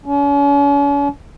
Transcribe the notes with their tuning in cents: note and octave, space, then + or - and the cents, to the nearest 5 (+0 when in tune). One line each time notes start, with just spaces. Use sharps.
C#4 +40